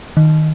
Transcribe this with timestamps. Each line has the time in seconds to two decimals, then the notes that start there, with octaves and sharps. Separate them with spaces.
0.17 D#3